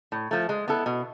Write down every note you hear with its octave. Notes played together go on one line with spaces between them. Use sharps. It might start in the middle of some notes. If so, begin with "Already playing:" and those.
A2
F3 A3
G#3
B3 E4 A4
B2